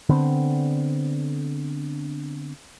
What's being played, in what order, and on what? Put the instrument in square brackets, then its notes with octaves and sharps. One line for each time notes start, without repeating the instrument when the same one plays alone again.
[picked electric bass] D3 B3 C4